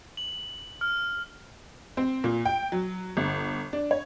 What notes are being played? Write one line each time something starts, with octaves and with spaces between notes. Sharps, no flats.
F#7
F6
C4
A#2
G5
F#3
G1
D4
C#5